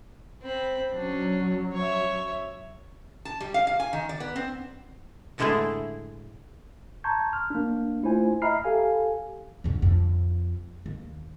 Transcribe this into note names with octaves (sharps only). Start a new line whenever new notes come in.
C4 B5
F#3 C#4 D4
C#5 E5
A5
G3
F5
F5
G#5
D#3
D5
B3
C4
A2 D3 G#3 A3 E4 G#4
A5 A#5 C6 C#6 G6 G#6
F6
A#3 D4
A3 E4 F4 C5 G#5
D#5 E5 A#5 B5 F6 C7
G4 A4 F5 G#5
F2 D3
F2
D#2